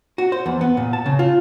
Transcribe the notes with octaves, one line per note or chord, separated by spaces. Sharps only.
F#4
C5
E2
B3
A#2
A5
C#3
F4